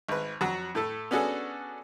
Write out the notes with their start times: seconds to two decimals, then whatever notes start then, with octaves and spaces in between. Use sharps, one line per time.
0.09 G#1 B4
0.41 F2 F#3 F#4
0.75 A2 A3 A4
1.11 B3 C#4 D4 F#4 G#4 A4